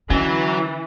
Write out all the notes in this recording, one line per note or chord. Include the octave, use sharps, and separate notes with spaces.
D3 E3 F#3 C#4 D#5